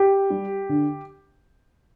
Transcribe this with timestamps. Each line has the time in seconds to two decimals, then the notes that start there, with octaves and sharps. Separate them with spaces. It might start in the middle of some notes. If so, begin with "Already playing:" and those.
Already playing: G4
0.30 G3
0.69 D3